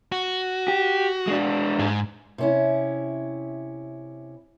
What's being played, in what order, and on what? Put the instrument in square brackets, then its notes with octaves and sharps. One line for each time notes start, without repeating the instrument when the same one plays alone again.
[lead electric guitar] F#4
[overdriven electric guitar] G4
G#3 D4
[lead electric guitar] G#2
[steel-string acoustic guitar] C3 C#4 E4